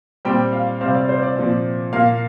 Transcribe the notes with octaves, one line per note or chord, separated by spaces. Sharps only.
A#2 G3 C4 G5
F5
C3 G3 C4 F5
D5
C5
D5
A#2 F3 C4
A#2 A#3 F5